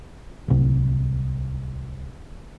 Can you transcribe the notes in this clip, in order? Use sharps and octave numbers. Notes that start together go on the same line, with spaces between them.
D1 C2